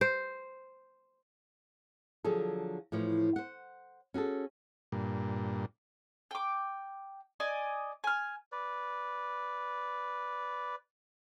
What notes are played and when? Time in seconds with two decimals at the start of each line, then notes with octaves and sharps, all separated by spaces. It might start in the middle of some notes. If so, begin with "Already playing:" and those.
0.01 C5
2.24 D3 F3 F#3 G#4 A4
2.92 A2 E3 F3 C#5
3.36 C5 F#5
4.14 C#4 F#4 G#4 A4
4.92 G2 A#2
6.31 G5 D6
7.40 D5 D#5 G#5
8.04 G#5 F6
8.52 B4 D5